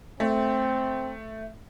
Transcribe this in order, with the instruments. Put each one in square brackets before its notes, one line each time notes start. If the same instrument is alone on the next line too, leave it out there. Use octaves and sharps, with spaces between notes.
[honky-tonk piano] A3 [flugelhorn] C4